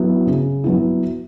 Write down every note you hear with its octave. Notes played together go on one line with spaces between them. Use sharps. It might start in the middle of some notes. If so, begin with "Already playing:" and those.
Already playing: F#3 B3 E4
C#3
F#3 B3 E4